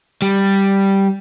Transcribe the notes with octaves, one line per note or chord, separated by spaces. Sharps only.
G3